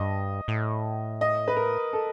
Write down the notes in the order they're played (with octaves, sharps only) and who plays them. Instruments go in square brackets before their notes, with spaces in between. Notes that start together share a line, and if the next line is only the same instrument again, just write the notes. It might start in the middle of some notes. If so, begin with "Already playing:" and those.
Already playing: [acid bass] G2 [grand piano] D#5
[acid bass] A2
[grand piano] D#5
B4
A#4
A4